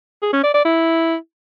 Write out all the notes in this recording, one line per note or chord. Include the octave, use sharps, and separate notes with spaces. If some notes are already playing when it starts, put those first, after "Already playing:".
G#4
C#4
D5
D5
E4